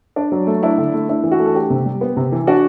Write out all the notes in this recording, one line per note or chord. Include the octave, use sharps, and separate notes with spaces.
D4
F#3
A3
D4 E4
D3
A3
D4 E4
E3
F#4
A3
A4
D4 G4
C3
G3
B3
C3
E3
D4 F#4